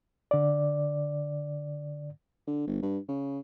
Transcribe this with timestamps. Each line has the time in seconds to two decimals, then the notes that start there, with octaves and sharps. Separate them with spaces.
0.31 D3 D5
2.47 D3
2.67 G1
2.82 G2
3.09 C#3